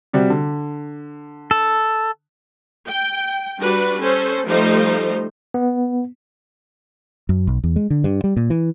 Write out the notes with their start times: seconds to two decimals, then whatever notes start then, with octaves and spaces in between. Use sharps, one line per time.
0.13 C3 G3 F#4
0.30 D3
1.51 A4
2.87 G5
3.60 G3 D4 F#4 B4
4.01 C#4 A4 C5
4.46 F3 G3 A3 D#4 C5
5.54 B3
7.29 F#2
7.47 B1
7.64 E2
7.76 G#3
7.90 D3
8.04 G2
8.24 G3
8.37 A#2
8.50 E3